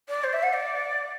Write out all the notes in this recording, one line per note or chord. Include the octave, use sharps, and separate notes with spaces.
D5
C5
E5
F#5
D5